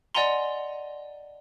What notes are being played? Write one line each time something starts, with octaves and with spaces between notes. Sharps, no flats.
D5 D#5 F#5 G#5 A#5 C6